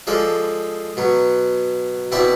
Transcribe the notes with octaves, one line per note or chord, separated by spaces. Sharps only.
F3 G#3 A4 D5
B2 F#3
B2 C4 E4 D5 A5